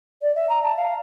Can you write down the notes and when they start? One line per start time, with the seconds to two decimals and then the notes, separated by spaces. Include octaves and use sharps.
0.22 D5
0.36 E5
0.49 A#5
0.63 A5
0.77 F5